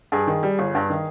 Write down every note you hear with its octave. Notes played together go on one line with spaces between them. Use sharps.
G2 G#4
D#3
G3
G1
G2
D#3